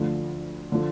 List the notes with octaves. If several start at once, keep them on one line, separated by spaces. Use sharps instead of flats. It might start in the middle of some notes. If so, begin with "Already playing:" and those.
Already playing: D2 D3 F3
D3 F3